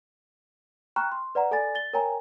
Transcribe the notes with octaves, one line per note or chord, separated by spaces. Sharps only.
G5 A#5 B5 C#6 F6 F#6
C6
B4 D5 F#5 A#5
A4 D5 G#5 B5 A6
A6 G7
A#4 C#5 G5 G#5 A#5